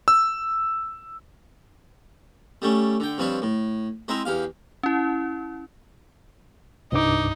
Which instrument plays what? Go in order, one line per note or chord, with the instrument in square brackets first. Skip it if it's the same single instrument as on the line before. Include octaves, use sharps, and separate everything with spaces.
[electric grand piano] E6
[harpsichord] G3 A3 C#4
D3 G5
G2 F3 C4 B4 C#5
A2
G#3 C4 E4 A#5
E2 G4 F5
[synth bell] C#4 E4
[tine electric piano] C2 G2 D6 [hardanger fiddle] D#4